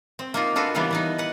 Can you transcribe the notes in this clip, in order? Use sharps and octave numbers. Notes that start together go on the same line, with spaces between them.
C4
A#3 D#4 F4
D4 F4 F#4 A4 B4
C#3 E3 G3 A#3 B3
E3 B3 D#4
B4 F#5